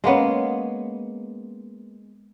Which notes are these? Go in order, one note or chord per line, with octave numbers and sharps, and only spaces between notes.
G#3 A#3 B3 C#4